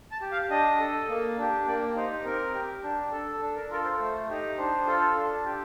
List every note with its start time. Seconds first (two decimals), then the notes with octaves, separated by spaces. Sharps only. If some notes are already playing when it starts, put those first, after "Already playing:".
0.12 A5
0.22 G4
0.32 F5
0.50 D4 D#5
0.80 A4
1.08 A#3
1.38 D4 G4
1.66 A#3 D5
1.96 D#4 G4 C5
2.25 C4 A#4
2.54 G4
2.83 D4
3.12 A4
3.41 D4
3.56 A#4
3.70 F4 A4 A#4
3.85 C5
4.00 A3 C5
4.29 D#4 G4
4.58 D4 C5
4.87 F4 A4
5.15 D4
5.45 G4